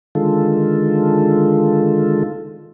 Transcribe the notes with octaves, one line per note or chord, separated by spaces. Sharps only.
D3 D#3 G#3 F4 A4